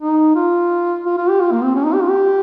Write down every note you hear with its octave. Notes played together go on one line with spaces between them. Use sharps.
D#4
F4
F4
F4
G4
F4
A#3
C4
C#4
D#4
G4
F4
G4